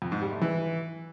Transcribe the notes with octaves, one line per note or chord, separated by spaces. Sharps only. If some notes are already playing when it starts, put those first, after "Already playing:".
F2
G#2
G3
A3
E3